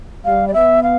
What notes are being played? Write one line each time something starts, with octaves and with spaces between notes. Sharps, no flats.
G3 F5
D5
B3 E5
F5